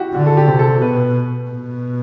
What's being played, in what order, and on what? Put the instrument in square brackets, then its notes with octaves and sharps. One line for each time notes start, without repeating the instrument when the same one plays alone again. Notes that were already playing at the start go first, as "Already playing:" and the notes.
Already playing: [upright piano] E4 F#4 G4
[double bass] D3 [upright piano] F#4
[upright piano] A4
G4
[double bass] C3
[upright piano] A4
[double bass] B2 [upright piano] B4
[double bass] B2